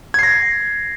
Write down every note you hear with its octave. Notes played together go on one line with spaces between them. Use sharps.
G#6 A#6 C7